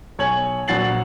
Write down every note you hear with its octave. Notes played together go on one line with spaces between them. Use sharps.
B1 C#5 G#5 G#6 F#7
A#1 F#3 F#4 A6 C7 F#7